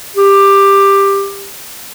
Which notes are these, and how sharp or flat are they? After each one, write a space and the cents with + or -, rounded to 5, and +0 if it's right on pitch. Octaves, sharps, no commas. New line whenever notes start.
G4 +10